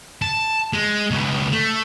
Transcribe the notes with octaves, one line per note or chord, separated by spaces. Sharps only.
A5
G#3
C#2 B2
A3